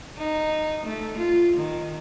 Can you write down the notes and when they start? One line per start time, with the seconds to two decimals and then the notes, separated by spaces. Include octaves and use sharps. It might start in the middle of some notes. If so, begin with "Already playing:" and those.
0.17 D#4
0.86 A3
1.17 F4
1.56 D#3